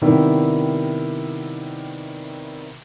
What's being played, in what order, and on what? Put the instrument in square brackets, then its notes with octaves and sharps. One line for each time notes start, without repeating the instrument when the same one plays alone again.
[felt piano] C3 D#3 G3 B3 E4